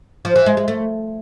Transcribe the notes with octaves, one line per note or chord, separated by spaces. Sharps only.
F3
E3
G#3
G#3
A3